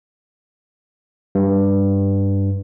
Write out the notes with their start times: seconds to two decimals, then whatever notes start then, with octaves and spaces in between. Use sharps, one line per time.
1.35 G2